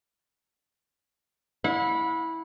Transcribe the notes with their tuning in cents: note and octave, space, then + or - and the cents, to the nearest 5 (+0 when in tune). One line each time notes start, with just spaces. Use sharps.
E4 -15 F#5 -40